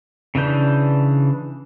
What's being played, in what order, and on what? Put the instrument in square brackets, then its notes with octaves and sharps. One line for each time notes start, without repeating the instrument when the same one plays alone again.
[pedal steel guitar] C#3 E3 D4 G6